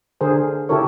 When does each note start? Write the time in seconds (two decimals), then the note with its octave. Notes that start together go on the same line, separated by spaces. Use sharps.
0.21 D3 G#4 A#4 C5
0.69 C#3 E4 G4 A4 A#4 C#5